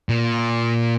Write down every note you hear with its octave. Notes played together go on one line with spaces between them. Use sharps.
A#2